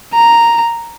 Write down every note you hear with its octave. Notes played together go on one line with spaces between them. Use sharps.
A#5